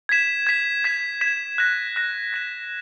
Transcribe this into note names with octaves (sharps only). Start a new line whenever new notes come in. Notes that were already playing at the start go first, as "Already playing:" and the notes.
G#6 B6 E7
G#6 B6 E7
G#6 B6 E7
G#6 B6 E7
F#6 A#6 E7
F#6 A#6 E7
F#6 A#6 E7